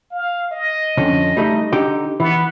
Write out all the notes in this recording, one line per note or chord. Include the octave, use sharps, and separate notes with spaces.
F5
D#5
F2 D3 C#4
G3 A3 D#4
D3 D#4 G4
E3 B3